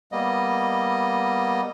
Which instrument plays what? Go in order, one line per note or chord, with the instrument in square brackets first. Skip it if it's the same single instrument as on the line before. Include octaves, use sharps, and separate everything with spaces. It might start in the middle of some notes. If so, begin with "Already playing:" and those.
[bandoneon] G3 A#3 B3 D#5